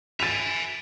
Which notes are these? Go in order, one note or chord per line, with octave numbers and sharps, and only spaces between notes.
E5 G#5 A6 D7 F7